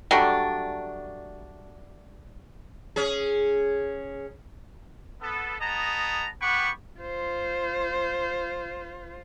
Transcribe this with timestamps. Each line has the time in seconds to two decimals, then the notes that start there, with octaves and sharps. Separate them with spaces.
0.11 F#3 G3 A3 D4
2.96 C#4 G#4
5.22 B3 A4
5.60 B3 G#4 D#5 A5 A#5
6.41 B3 G4 F#5 G5 B5 C#6
7.00 F4 C5